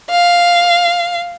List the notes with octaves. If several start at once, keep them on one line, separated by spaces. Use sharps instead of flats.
F5